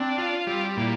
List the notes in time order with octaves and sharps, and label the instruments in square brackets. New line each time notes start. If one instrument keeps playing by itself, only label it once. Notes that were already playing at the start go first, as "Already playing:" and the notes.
Already playing: [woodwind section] C4 [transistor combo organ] D4
[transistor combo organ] F4
[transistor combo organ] G3 [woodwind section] C4
[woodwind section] F4
[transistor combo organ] A#2 [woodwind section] E4